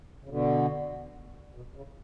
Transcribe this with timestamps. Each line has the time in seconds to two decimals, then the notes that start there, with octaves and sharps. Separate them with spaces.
0.24 C#3
0.29 B2 D3
1.55 B2
1.75 C#3